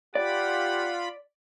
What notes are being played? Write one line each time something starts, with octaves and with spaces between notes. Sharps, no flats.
F4 G4 D5 F#5 B5